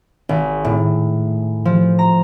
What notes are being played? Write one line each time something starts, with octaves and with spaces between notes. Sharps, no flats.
G#1
A2
F3
A#5